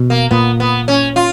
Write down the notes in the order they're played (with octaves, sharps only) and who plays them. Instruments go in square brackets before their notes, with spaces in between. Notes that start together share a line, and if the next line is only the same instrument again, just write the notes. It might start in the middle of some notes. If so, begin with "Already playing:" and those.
Already playing: [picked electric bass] B2
[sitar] A#3
[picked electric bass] A#2 [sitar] B3
[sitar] B3
C#4
F4